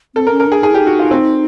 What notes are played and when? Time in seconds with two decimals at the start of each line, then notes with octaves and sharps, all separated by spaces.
0.15 C4 A4
0.27 A#4
0.31 C#4
0.40 A#4
0.47 D4 G#4
0.63 D#4 G#4
0.71 E4 G4
0.80 D#4
0.86 F#4
0.99 F4
1.11 C4